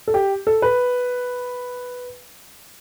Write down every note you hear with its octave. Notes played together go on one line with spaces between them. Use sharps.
A4
G4
A4
B4